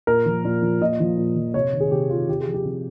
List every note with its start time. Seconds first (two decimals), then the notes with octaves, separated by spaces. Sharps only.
0.07 A#2 A#4
0.26 F3
0.45 A#2
0.62 F3
0.81 A#2 D#5
1.00 F3
1.17 A#2
1.36 F3
1.54 C3 C#5
1.73 D#3
1.80 G#4
1.91 C3 G4
2.10 D#3 F4
2.29 C3 G4
2.40 G#4
2.47 F3
2.54 G4
2.65 C3